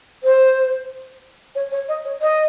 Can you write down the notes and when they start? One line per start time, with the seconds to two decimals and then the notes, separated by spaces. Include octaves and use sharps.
0.23 C5
1.55 C#5
1.72 C#5
1.88 D#5
2.05 C#5
2.22 D#5